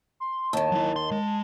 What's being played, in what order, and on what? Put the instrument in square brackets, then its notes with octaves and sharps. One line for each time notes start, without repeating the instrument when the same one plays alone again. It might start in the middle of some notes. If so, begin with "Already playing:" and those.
[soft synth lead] C6
[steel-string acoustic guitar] D#2 D#3 [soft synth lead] A5
[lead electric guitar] F#3 E4
C6
G#3